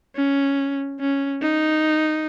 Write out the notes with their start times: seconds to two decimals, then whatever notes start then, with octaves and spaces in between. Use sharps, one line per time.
0.16 C#4
1.00 C#4
1.42 D#4